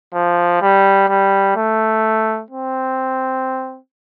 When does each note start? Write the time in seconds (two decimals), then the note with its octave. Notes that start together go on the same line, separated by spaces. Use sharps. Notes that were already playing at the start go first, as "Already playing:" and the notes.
0.14 F3
0.62 G3
1.09 G3
1.57 A3
2.51 C4